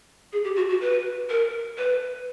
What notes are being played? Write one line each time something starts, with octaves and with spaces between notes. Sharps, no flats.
G#4
G4
F#4
F#4
B4
A#4
B4